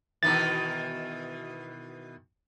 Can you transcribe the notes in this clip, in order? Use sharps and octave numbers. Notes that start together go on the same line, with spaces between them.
B2 D#3 E3 A6